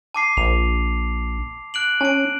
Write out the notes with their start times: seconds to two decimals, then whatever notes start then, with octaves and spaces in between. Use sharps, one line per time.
0.14 A5 D6 C7
0.37 A#1 F7
1.74 F#6 D7 F#7
2.01 C#4 A5 D7